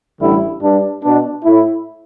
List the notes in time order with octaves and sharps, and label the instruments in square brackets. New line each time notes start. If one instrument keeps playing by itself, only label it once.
[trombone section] A1 G2 D3 G3 E4
G2 G3 D4
B2 B3 D4
A2 A3 E4